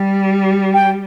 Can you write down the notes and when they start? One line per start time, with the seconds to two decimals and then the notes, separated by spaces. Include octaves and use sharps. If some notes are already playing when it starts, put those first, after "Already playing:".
Already playing: G3
0.74 G5